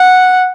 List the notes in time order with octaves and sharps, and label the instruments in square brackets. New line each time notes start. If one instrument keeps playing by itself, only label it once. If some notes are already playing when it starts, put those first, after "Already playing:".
Already playing: [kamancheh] F#5